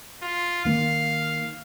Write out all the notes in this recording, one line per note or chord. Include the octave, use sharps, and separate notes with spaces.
F4
D#3 A#3 F5